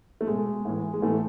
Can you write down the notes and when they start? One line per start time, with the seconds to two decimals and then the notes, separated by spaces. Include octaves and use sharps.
0.21 A3
0.27 B2 G#3
0.65 A2 E3
0.93 G#3
1.02 A2 E3 A3